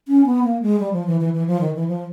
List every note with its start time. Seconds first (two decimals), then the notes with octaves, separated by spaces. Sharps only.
0.08 C#4
0.26 B3
0.44 A#3
0.62 G#3
0.80 G3
0.93 F3
1.07 E3
1.20 E3
1.34 E3
1.47 F3
1.61 D#3
1.75 E3
1.88 F3